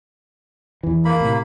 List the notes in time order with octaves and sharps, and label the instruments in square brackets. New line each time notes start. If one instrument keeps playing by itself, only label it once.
[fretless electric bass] E2 E3
[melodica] A#3 B5
[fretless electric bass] A2 C3